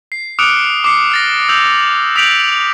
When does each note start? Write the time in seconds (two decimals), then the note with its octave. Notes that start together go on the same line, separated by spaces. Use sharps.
0.12 C7
0.39 D6 D#6 F6 F#6 C#7 D7
0.84 D6 C7 C#7
1.12 F6 A6 A#6
1.49 E6 G6 F7
2.16 D#6 G6 B6 D7 F7 F#7